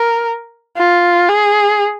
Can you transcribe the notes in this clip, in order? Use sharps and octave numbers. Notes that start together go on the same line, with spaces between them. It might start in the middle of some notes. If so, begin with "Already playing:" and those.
Already playing: A#4
F4
G#4